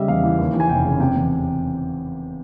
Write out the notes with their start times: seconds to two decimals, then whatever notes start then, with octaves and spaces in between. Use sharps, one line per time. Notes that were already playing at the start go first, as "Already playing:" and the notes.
Already playing: C#3 G3 D#5 E5
0.08 E2 F5
0.24 E3
0.38 D#2
0.54 E3
0.60 G#5
0.69 F1 G5
0.85 C#3
1.00 C3 G5
1.15 E2